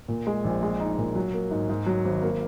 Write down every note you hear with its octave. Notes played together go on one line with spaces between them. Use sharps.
A#2
G#3
A#1
G#3
D#4
A#2
F#3
A#3
G#2
G#2
F#3
G#1
A#3